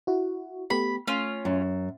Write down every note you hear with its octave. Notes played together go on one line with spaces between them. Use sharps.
E4 F#4
A3 B3 G4 B5
A3 C#4 F4
F#2